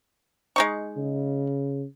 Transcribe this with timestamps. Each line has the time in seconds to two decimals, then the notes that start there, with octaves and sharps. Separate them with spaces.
0.56 G#3 D#4 C#6
0.97 C#3